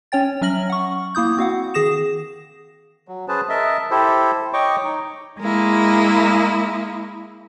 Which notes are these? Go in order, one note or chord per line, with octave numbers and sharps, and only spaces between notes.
C#4 C#5 G5 A6
F#3 C#4 E5 F6 A#6 F#7
F#5 C#6
A#3 E4 D#6 G6
C4 F#4 F5 F#5
D#3 G#4 D#6 A#6 E7
F#3
C#4 G#4 B4 C5 A5
A#4 D#5 E5 A5
E4 G4 A4 C5
C#5 D#5 G5 C#6 D6
D#4
G#3 A#3 E4